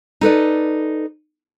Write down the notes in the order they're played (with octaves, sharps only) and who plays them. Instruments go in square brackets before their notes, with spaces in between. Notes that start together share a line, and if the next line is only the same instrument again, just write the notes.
[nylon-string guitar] D#4 A4 B4 D5